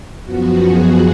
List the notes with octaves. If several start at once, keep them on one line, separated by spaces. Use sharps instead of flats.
F#2 F3 B3 F#4
G#4